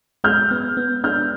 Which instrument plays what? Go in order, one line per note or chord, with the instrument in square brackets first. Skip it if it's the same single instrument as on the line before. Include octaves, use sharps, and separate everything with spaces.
[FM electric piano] G#3 [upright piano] F6 G6
[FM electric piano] B3
B3
[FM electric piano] D4 [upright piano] F6 G6